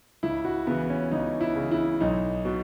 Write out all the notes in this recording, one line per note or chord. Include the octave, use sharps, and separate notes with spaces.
C#2 E4
F#4
C#3 E3 B3
C#4
C#2 D#4
E4
C#3 E3
E4
B1 D#4
B2